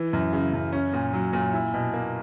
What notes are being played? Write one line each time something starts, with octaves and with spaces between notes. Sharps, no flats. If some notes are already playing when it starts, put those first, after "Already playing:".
Already playing: E3
F#2
C#3
F#2
C#4
A#2
F#3
A#2
E4
B2
A#3